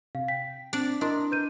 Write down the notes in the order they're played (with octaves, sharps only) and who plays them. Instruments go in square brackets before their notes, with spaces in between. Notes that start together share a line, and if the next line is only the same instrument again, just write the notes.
[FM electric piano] C3 [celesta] F5
[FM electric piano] G5 [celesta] B6
[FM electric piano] C4 [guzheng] D4 D5
[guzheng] D4 [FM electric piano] E4 D#5 A#5 [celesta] A#4 C6
[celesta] B4 G6 D#7